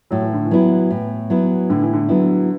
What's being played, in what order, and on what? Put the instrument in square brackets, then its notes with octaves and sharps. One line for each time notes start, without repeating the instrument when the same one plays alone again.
[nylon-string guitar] A2 [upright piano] F#3
[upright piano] E3
D3
E3
[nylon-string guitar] F#3 B3 E4
A2
F#3 B3 E4
[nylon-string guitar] A2 [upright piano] D3
[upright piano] E3
D3
[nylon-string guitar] F#3 B3 E4